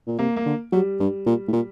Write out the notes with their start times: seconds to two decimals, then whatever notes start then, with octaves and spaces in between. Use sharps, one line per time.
0.07 A#2
0.19 C3 A#3
0.36 A#3
0.46 D3
0.72 F#3 G3
1.00 G2
1.26 A#2
1.48 A2
1.53 A#2